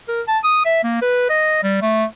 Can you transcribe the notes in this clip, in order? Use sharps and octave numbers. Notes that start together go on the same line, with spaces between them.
A#4
A5
D#6
E5
A#3
B4
D#5
G3
A3